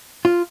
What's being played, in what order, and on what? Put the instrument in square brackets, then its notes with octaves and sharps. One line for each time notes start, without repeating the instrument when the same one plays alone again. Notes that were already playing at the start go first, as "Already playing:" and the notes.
[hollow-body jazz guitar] F4